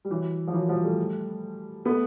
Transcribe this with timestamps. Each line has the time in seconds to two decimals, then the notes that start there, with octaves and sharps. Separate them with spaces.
0.05 G3
0.10 E3 F#3
0.47 F3
0.54 E3 F#3
0.69 F3 G3
0.83 G3 A3
1.85 A3 B3